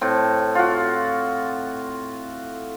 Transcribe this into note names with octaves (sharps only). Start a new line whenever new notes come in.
A2 C4
F4 F#4